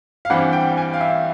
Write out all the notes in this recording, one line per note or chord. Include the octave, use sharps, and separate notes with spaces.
F5
G2 E3 G3 C4 F#5
G5
G#5
F5
E5